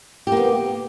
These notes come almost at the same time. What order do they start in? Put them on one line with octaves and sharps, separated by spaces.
G4 A#3 B3